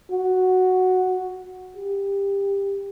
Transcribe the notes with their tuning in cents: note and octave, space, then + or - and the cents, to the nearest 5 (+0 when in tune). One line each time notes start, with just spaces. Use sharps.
F#4 +0
G4 +20